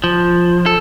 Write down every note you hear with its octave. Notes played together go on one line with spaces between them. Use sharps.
F3
A4